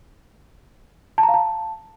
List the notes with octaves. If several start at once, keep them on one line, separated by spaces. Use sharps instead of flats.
A5
A#5
F5
A5